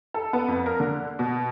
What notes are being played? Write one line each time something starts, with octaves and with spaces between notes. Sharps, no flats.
A4
B3
F2
A#4
D3
B2